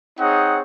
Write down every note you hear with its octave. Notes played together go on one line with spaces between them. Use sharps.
C4 D#4 G#4 C#5 F#5